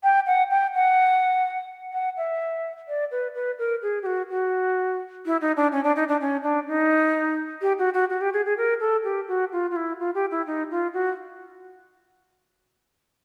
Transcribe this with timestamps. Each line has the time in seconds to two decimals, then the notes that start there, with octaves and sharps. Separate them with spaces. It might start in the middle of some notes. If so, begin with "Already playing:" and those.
0.03 G5
0.27 F#5
0.50 G5
0.74 F#5
1.93 F#5
2.17 E5
2.88 D5
3.11 B4
3.35 B4
3.59 A#4
3.82 G#4
4.02 G4
4.06 F#4
4.30 F#4
5.26 E4
5.41 D#4
5.56 D4
5.72 C#4
5.84 D4
5.96 D#4
6.08 D4
6.20 C#4
6.43 D4
6.68 D#4
7.62 G4
7.78 F#4
7.94 F#4
8.10 F#4
8.21 G4
8.33 G#4
8.45 G#4
8.57 A#4
8.80 A4
9.04 G4
9.28 F#4
9.52 F4
9.71 F4
9.76 E4
9.99 F4
10.14 G4
10.31 E4
10.46 D#4
10.71 F4
10.93 F#4